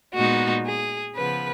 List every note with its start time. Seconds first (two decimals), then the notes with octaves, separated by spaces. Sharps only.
0.16 A#2 G#3 B3 D#4 F#4
0.66 G#4
1.16 C#3 F3 B3 B4